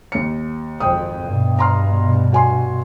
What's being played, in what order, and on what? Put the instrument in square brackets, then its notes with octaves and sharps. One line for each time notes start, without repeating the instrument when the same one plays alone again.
[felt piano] D#2 C#7
[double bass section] G#1 F2 [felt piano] C5 G5 D#6
[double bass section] G2 B2
[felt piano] A#5 C6 F6
F#4 G#5 C6